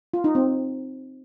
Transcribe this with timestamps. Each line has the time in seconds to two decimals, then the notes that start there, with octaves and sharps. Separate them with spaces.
0.14 F4
0.24 D#4
0.35 C4